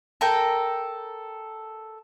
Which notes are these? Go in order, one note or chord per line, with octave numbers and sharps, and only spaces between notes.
A4 A#4 G5